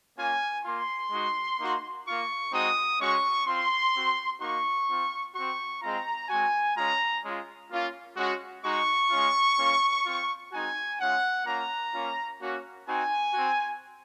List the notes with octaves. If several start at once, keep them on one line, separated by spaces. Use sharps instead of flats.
A#3 C#4 F4 G#5
A#3 F4 C6
G#3 D#4 F#4
A#3 D#4 F#4
A#3 F4 C#6
G#3 C4 D#4 F#4 D#6
G#3 C#4 F#4 C#6
C4 F4 C6
C4 F#4
A#3 D#4 F#4 C#6
C4 F4
C4 F#4 C#6
G#3 C4 F4 A#5
G#3 C4 F#4 G#5
G#3 C#4 F4 A#5
G#3 C#4 F4
A#3 C#4 F4
G#3 C#4 F#4
G#3 D#4 F#4 C#6
G#3 C#4 F4
A#3 C#4 F4
C4 F4
G#3 C4 D#4 F#4 G#5
G#3 C#4 F4 F#5
A#3 C#4 F4 A#5
A#3 C#4 F4
A#3 C#4 F#4
C4 D#4 F#4 G#5
C4 F#4